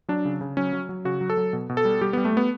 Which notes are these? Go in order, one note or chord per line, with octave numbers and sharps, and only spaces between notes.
F#3 D4
C#3
C#3
F#3 C#4
F#3
F#3
C#3 F#4
F#3
A4
F#3
B2
B2
A4
G3
G3 G4
G3 B3
A3
G3 B3